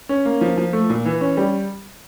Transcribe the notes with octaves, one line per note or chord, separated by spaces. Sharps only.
C#4
A#3
F3
F3
A3
A#2
E3
C#4
G3